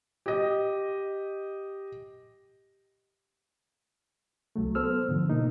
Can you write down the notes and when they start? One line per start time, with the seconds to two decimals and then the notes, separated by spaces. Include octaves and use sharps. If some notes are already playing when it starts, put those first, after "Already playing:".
0.26 G4 D#5
4.56 C2 F#3 A3
4.75 B3 A4 C5 E6 F6
5.08 G#2 D3 F3
5.30 B2 A#3 D#4